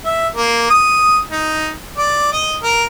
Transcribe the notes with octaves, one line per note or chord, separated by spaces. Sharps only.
E5
A#3
D#6
D#4
D5
D#5
A#4